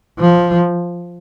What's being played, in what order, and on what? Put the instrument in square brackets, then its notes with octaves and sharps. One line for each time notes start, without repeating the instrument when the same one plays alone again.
[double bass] F3